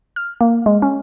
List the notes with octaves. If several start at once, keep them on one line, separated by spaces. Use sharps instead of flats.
F6
A#3
G#3
C#4